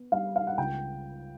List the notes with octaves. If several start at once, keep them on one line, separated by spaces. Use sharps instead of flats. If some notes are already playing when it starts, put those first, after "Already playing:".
Already playing: B3
G3 F5
F5
F#5
C#2 G5